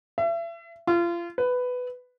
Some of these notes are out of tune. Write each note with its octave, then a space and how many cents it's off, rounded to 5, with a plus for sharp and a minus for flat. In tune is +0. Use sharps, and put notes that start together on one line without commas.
E5 +35
F4 -30
B4 +10